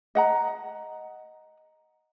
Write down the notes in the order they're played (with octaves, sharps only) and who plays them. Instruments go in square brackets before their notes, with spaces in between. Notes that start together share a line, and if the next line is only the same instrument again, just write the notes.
[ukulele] D#5 F#5 A#5